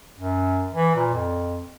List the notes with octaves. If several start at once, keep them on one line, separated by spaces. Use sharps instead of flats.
F#2
E3
A#2
F2